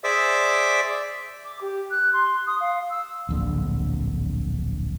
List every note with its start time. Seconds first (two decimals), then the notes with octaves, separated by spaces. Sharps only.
0.04 G#4 C5 D5 E5 D6 E6
1.44 D6
1.61 G4
1.91 F#6
2.13 C6
2.46 D#6
2.60 F5
2.90 E6
3.29 D1 A#1 D3